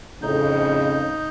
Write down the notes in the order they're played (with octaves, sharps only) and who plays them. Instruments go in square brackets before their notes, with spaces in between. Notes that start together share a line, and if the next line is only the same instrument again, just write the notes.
[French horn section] F2 A2 C#3 [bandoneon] D#4 G6